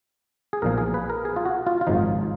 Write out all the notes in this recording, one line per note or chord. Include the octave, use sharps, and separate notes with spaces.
G#4
B1 A#2 F3 A#4
G#4
B4
A#4
G#4
F4
F#4
F4
F4
G#1 F#2 C#3 F3 D#4